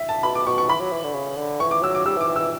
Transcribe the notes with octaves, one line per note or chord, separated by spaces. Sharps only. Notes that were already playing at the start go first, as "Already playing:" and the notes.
Already playing: E5
A5
B2 B5
D6
B2 C#6
C#6
E3 B5
F#3
E3
D3
C#3
D3
E3 C#6
D6
F#3 E6
D6
G3 E6
E3
D6
E3
E6
E3